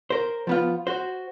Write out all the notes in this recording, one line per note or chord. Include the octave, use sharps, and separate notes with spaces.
A#4 C5
F3 B3 F4
F#4 C5